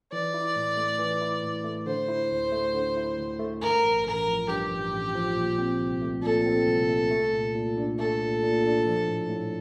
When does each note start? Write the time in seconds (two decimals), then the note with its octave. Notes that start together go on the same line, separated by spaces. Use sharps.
0.12 E3 D5
0.34 E4
0.56 A2
0.77 A3
0.99 E3
1.21 E4
1.43 A2
1.64 A3
1.86 D3 C5
2.09 E4
2.31 D2
2.52 A3
2.74 D3
2.97 E4
3.18 D2
3.39 A3
3.62 G2 A#4
3.84 A1
4.06 A1 A#4
4.28 F3
4.48 G2 G4
4.70 A1
4.93 A1
5.15 F3
5.36 A#2
5.59 C4
5.81 C2
6.02 A3
6.23 A#2 A4
6.46 C4
6.68 C2
6.89 A3
7.11 A3
7.33 A#2
7.55 A#2
7.77 D4
7.98 A3 A4
8.21 A#2
8.43 A#2
8.64 D4
8.86 F3
9.08 A2
9.29 A2